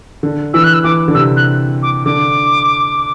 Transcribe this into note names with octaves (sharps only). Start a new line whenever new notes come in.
D3
E3 E6
F#6
E6
E3 D6
D3
C3 E6
F#6
D6
D3 D6